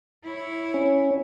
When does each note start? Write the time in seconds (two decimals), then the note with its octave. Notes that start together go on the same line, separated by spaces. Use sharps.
0.24 E4 C#5
0.74 C#4